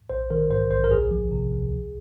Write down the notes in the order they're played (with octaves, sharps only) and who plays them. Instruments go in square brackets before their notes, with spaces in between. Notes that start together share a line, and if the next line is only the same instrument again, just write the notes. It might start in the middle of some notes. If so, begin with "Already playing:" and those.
[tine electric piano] A#1 C5
D#3 A#4
G#2 C5
A#1 C5
A#4
C#2 G#4
F3
C3
C#2
C2